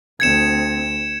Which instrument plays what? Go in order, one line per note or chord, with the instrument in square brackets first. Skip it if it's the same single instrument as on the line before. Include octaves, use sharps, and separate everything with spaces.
[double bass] D2 C4 [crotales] G#6 C#7 E7